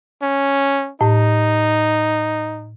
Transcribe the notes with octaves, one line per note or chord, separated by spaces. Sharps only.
C#4
A2 D#4